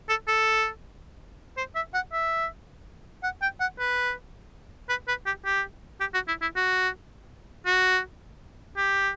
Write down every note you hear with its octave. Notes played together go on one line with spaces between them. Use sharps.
A4
A4
C5
E5
F#5
E5
F#5
G5
F#5
B4
B4
B4
G4
G4
G4
F#4
E4
E4
F#4
F#4
G4